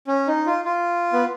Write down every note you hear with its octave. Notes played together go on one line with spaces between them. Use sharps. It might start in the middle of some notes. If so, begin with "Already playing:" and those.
C#4
D#4
F4
F4
B3